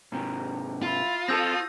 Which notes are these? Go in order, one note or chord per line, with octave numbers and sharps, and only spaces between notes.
G#2 C3 A#5
E4 F4
C4 G#4 A4 D#6 E6 G6 A#6